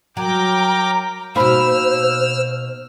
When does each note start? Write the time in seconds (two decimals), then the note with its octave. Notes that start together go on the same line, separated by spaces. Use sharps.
0.17 F#3 A#4 G5 A#5 D6
1.36 B2 A#3 D#4 C5 B5 E6 F6